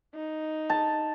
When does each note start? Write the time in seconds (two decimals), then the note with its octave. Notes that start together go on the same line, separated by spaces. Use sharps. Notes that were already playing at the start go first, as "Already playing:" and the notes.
0.15 D#4
0.70 A5